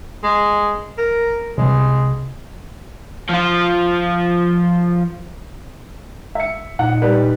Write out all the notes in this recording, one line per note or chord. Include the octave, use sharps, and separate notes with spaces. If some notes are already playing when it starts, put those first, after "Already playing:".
G#3
A#4
C2 C3 G#3
F3 F4
E5 C#7
A#2 D#4 F#5
G3 B4 D5